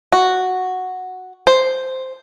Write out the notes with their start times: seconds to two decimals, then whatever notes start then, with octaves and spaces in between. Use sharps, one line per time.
0.12 F#4
1.47 C5